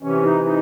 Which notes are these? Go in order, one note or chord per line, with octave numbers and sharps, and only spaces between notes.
C3 E3 C#4
D#4
D#4